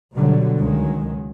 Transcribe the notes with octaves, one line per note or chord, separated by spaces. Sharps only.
B2 D3 F#3 G3
C#2 D#3 F#3 G#3